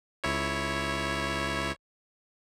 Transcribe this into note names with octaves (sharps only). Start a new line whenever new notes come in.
C#2 E4 C#5